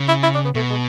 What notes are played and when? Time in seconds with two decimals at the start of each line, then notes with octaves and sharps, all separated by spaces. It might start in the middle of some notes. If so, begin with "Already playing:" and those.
Already playing: C#3
0.08 E4
0.23 E4
0.34 D4
0.45 B3
0.55 B2 A3
0.70 G#3